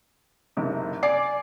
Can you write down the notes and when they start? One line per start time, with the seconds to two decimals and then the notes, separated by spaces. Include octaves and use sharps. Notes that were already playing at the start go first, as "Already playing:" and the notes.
0.57 F#1 B1 C3
1.03 D5 G#5 D6 C7